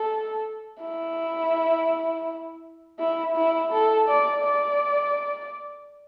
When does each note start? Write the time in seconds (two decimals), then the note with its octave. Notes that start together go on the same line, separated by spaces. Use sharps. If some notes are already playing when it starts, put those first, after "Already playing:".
Already playing: A4
0.81 E4
2.99 E4
3.36 E4
3.72 A4
4.08 D5
4.44 D5